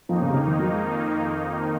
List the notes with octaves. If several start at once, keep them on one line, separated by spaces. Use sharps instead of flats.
F2 D#3 F3 A#3 D#4
C#3
C3
C#3
D#3
F#3
G#3